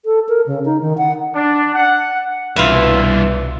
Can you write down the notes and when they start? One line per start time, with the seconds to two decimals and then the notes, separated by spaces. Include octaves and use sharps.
0.05 A4
0.29 A#4
0.47 C#3
0.65 D#4
0.81 D#3
0.98 F#5
1.35 D4
1.75 F#5
2.56 C2 G2 B2 E3 F4 B4 E5